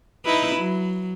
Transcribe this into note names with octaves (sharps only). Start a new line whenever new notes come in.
D#4 E4 B4
F#3